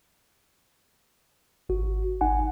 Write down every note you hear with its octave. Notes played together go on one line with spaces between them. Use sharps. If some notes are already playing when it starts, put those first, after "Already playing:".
G#1 F#4
G#1 D#4 F#5 G#5